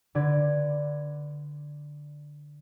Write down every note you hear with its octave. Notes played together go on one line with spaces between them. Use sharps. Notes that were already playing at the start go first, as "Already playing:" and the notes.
D3 B4 D5 G#6